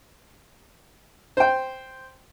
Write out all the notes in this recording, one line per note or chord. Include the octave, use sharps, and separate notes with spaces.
C5 G5